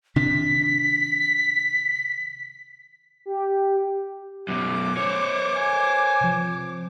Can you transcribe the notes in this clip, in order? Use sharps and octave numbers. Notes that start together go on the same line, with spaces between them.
C3 D#3 D4 B6
G4
F#2 B2 D6
C5 C#5
G#5
C3 F3